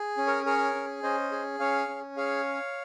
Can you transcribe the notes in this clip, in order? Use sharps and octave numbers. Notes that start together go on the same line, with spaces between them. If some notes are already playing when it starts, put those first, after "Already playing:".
Already playing: G#4
C#4
A#4 C#5
G#4 A#4 C#5
C#4
C#4 C5 D#5
G#4
C#4 C#5 F5
C#4
G#4 C#5 F5